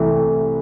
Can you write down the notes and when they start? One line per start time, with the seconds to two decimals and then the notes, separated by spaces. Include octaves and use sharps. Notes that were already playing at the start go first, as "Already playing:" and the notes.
Already playing: C2 C3 E3 A3